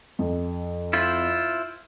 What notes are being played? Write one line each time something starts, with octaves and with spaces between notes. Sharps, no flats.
F2
E4 F4 C5